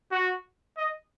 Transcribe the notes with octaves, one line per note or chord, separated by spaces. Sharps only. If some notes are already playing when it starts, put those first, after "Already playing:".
F#4
D#5